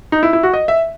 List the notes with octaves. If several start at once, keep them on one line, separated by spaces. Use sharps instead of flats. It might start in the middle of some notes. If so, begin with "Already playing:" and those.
D#4
E4
E4
F#4
D#5
E5